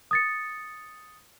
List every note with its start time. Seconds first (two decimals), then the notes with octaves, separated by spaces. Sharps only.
0.11 D#6 A6 C#7